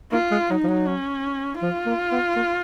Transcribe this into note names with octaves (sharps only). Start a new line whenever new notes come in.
A#3 F4
G#3
F#3 D#4
F3
F#3
C#4
F3 F4
A#3
B3
A#3